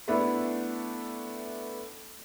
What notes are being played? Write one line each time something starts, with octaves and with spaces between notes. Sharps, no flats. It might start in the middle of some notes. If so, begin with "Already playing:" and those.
A3 B3 D4 E4 A4 B4